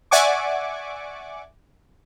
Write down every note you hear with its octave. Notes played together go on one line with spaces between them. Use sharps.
D5 E5 F#5 G#5 C#6 D6